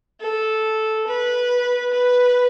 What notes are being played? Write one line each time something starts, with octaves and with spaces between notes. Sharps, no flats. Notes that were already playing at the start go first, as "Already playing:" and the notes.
A4
B4
B4